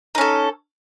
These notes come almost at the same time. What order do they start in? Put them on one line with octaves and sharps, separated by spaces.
D#4 C#4 A4